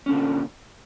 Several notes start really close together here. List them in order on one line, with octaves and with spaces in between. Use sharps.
C#4 D3 A#2